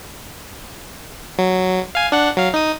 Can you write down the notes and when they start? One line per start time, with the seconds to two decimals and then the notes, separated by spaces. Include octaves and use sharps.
1.39 F#3
1.95 F5 G#5
2.12 D4 F#5
2.37 F#3 F5
2.54 D#4 D#6